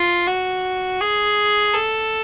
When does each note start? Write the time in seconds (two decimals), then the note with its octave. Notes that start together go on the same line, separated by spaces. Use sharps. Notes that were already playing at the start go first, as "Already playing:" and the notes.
Already playing: F4
0.27 F#4
1.00 G#4
1.74 A4